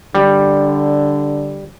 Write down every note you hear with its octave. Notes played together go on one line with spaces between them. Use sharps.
D3 G3